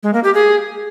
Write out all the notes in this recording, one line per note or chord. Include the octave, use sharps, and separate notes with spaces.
G#3
A#3
G4
G#4